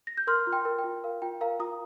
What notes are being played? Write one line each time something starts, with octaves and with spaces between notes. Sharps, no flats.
A#6
G6
A#4 C6 F6
F4
G5 C6
A#4
G5
F4
A#4 F5
F4 G5
A#4 F5 A#5
F4 A#5 D#6